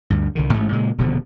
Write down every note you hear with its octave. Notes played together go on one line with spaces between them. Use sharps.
D2 G2
C2 D3 D#3
A1 G#2 A3
A#2 C#3 G#3
D#1 B2 D3 F3